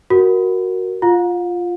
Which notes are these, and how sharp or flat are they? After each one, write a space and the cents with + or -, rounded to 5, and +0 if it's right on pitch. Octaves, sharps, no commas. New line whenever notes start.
F#4 +0 A#4 +0
F4 +0 F5 +45